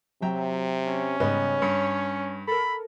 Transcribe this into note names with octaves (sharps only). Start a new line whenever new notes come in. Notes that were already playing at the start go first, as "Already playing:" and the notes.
C3 F#3 E5 G5 A#5
C#4
G#2 C#3 G3 B3 C#5 D#5
G2 C#7
A4 A#4 B5